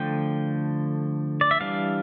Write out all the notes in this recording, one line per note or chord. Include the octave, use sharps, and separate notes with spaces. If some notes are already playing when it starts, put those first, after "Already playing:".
Already playing: D3 F3 A3 G5
D5
E5
E3 G3 D4 F5